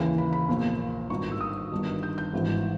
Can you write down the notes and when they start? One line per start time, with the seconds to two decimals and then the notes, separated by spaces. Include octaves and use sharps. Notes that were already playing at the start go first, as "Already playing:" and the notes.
Already playing: D#2 C#3 E3
0.18 B5
0.33 B5
0.49 A#1 A#2
1.10 G#1 G2 D#3 C#6
1.32 E6
1.41 D#6
1.71 G1 G2 D#3
2.03 G6
2.18 G6
2.33 G#1 G#2 E3